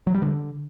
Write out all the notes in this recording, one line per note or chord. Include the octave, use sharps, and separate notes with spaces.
F#3
G3
D3